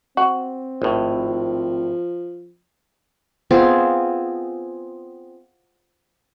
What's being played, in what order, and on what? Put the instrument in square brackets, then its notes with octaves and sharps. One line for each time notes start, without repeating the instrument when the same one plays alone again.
[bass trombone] C4 [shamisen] F#4
[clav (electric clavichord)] G#1 A2 [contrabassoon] F3
[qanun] B3 C4 F4 G#4